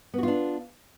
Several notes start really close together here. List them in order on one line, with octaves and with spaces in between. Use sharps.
B3 F#4 F4 D4